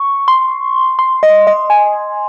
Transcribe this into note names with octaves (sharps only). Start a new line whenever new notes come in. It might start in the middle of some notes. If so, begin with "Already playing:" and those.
Already playing: C#6
C6
C6
D#5
D#5
G#5